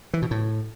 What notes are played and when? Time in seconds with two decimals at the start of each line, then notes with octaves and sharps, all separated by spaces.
0.14 E3
0.22 B2
0.31 A2